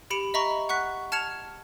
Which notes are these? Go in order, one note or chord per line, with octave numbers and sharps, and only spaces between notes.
G4 B5 C#7 D7 F7
D#5 E5 A#5 B5 C#6
F#5 C#6 F#6 B6
A5 F6 G#6 C#7 E7 F7